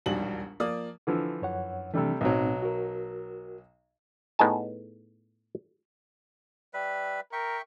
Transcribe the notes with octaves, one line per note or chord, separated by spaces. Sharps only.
E1 A#1 D#2 G3 F#7
F3 A#3 D5 D#6
D3 E3 F3
F#2 C#5 F#5
C3 E3 G3 A3 D4
B1 A2 F#3 C4 D#4
F#4 A#4
A2 B3 D#4 G#4 G#5 A5
G3 B4 E5
A#4 E5 G5 C#6